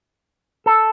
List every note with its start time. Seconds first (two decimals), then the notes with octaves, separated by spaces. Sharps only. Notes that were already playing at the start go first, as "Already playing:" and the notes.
0.66 A4